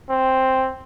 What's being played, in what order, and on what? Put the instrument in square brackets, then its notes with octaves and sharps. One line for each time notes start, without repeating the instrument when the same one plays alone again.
[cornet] C4